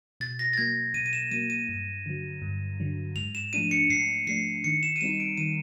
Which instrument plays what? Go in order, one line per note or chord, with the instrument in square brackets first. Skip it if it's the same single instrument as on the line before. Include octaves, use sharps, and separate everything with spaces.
[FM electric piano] B2 [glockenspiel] A6
[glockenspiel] A#6
A6
[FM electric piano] F#3 A#3 [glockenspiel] G#6
[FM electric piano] B2 [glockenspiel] D#7
[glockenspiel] D#7
E7
[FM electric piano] F#3 A#3 [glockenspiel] D#7
[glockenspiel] D#7
[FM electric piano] G2
D3 F#3
G2
D3 F#3
[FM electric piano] G#2 [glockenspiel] F7
[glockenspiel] E7
[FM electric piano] F3 A3 D4 [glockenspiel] D#7
[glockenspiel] C#7
[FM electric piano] G#2 [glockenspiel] C7
[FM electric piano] F3 A3 D4 [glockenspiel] C7
[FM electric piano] D#3 [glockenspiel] C#7
[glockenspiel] E7
D#7
[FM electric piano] G3 C4 D#4 [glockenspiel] E7
[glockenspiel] D7
[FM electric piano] D#3 [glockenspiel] D#7